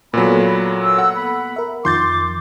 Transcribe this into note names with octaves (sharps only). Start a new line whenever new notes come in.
A#2 F#3 A#3 B3 A4 B5
E6
F#5
B5
A#4 E5
F2 D#3 F3 C6 D6 G6 A6